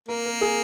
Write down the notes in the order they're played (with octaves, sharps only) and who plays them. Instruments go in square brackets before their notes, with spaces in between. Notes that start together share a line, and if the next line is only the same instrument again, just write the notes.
[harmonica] A#3 [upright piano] A#4
[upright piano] A#4
G#4